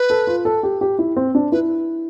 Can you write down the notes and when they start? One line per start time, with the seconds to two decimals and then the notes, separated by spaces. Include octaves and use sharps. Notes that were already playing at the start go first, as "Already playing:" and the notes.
Already playing: B4
0.10 A4
0.27 F4
0.45 A4
0.63 G4
0.81 G4
0.99 E4
1.16 C4
1.35 D4
1.52 E4 B4